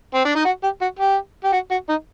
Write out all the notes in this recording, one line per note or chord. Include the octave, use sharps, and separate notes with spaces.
C4
D4
D#4
F#4
G4
F#4
G4
G4
F#4
F#4
D#4